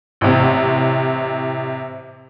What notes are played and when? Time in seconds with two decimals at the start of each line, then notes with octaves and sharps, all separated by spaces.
0.21 A1 C3